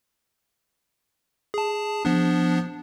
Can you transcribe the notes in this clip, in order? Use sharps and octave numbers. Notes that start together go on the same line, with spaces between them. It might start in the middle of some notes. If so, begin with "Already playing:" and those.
G#4 A5
F3 B3 D4